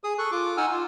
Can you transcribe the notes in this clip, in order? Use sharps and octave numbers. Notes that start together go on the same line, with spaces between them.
G#4 D#6
A4 C#6 F#6
F4 D6
D#4 F#5 G#5 E6 F6
F4